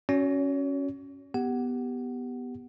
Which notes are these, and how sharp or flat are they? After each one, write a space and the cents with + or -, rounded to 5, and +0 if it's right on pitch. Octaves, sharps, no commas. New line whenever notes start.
C#4 +0 F#4 +0 C#5 +35
B3 +0 G4 +0 F#5 +10